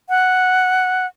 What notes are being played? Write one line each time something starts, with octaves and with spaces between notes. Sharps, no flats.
F#5